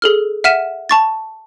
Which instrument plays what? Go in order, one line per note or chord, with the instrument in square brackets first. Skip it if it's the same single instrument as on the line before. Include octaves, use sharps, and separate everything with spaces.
[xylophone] G#4 A4 F6
E5 F#5 F6 B6 D#7 E7
A5 C#6 A6